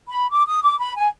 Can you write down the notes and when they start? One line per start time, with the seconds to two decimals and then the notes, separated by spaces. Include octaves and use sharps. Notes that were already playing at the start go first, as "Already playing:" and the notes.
0.08 B5
0.31 D6
0.47 D#6
0.63 D6
0.79 B5
0.96 G#5